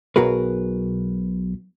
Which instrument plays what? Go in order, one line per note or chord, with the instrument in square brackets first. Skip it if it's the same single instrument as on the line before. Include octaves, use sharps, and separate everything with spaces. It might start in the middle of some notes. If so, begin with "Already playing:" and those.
[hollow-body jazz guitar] B1 B2 F#4 G#4 A#4 B4